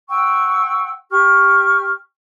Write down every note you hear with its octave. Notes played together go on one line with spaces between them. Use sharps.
F#5 G5 C#6 E6
G4 C#6 F6